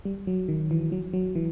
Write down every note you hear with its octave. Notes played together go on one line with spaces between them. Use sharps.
G3
F#3
D#3
E3
F#3
F#3
E3